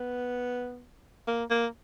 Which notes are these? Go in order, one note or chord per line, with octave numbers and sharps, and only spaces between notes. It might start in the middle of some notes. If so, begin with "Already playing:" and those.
Already playing: B3
A#3
A#3